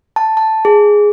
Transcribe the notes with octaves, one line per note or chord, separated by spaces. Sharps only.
A5
A5
G#4